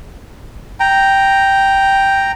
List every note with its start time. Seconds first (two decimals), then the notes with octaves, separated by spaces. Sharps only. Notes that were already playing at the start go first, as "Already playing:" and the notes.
0.80 G5 A#5